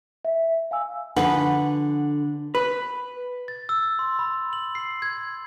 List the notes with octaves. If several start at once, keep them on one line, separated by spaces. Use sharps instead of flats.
E5
F5 G#5 E6
D3 F3 B3 D4 F#4 B4 F#5
B4
A6
E6
C6
B5
F#7
C7
G#6